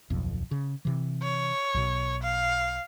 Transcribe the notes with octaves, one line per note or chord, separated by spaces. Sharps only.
D1 B1 F2
C#3
C3 E3
C#5
B1 B2
F5